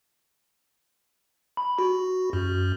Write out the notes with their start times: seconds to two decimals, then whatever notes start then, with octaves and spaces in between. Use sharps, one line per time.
1.57 B5
1.79 F#4
2.33 F#2